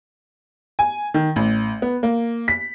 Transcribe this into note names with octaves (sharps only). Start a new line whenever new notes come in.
G#5
D#3
A1
B3
A#3
B6